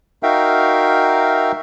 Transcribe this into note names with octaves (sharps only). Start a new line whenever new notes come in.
D#4 F#4 A#4 E5 F5 G5